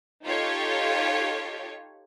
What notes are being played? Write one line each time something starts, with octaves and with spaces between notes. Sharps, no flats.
D#4 F4 G4 A4 C#5